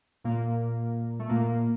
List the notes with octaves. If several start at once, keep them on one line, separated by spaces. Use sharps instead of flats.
A#2 A#3
A3
A#2 A#3